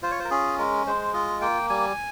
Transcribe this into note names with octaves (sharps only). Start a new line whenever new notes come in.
F4 C5
C#5
C5
A#4
C#4 G#4
G#3 A#4
G#3 C5
F4 D#5
A#3 G5
G3 G#5